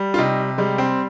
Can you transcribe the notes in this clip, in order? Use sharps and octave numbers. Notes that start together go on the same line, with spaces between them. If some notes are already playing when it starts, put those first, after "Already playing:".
Already playing: G3
F4
C3 D#4
G3 G#3
C4